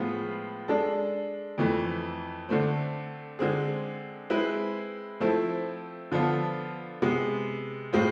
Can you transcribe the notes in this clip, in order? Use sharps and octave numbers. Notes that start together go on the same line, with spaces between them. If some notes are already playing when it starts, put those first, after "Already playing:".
Already playing: A2 F3 G#3 B3 F4
G#3 D4 A4
F2 E3 A3
D3 A3 C4
D3 G#3 C4 G#4
G#3 C4 E4 B4
F3 A3 C4 E4 A4
D3 F3 B3 F4 A4
C3 G#3 B3
A2 G#3 C4 F4